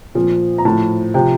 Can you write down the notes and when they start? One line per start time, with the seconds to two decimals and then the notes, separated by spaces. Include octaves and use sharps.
0.15 A#2 F3
0.58 A#5
0.65 A2 F3 A5
1.14 C3 F3 G5